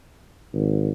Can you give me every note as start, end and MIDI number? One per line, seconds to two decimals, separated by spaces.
0.53 0.91 32